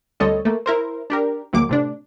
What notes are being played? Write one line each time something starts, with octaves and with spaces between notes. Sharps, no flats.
D2 G3 C4 A4 C#5 D#5
A3 A#3
E4 A#4 C5
D4 G4 A#4
D2 F#3 G#3 A#3 D6
A2 C3 D4